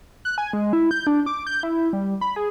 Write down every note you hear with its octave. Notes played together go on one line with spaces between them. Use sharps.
F#6
G#5
G#3
E4
G6
D4
D6
G6
E4
G3
B5
G#4